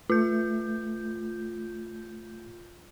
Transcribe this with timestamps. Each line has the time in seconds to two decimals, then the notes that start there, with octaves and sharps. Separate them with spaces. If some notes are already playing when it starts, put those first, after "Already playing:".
0.10 A3 F4 G6